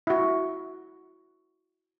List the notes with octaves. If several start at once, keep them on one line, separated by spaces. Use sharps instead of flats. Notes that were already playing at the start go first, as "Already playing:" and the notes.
E4 F#4